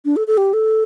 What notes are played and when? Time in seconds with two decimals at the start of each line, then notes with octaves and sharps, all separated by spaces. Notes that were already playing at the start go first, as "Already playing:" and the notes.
0.05 D4
0.16 A4
0.27 A4
0.37 G4
0.53 A4